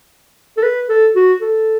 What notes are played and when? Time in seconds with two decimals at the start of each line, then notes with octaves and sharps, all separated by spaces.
0.57 A4
0.63 B4
0.89 A4
1.15 F#4
1.41 A4